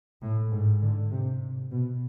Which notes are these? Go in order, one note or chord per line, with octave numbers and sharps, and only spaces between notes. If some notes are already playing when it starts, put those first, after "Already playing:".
A2
G#2
D3
C3
B2